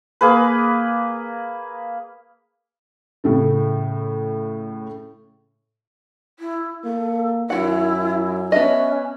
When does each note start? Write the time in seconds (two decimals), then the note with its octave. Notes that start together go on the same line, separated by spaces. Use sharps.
0.21 A#3 G#4 B4
3.24 A2 C#3 A3
6.39 E4
6.84 A#3 A4
7.50 F#2 D#3 E4 F4 F#5
8.52 B3 C#4 D4 D#5 E5